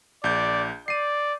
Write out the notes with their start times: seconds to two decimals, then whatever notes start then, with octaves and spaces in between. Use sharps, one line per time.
0.24 A#1 D5 G6
0.88 D5 C7 D#7